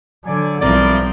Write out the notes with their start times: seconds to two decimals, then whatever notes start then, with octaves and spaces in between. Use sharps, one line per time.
0.25 D3 F#3 D5 G#5
0.61 B1 F3 G3 C4 E4 A#4 D5